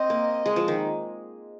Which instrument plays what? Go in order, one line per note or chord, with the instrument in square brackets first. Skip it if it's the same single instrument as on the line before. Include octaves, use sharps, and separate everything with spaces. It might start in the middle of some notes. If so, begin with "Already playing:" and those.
Already playing: [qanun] C4 [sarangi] D#5
[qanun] A#3
G#3
F3
D#3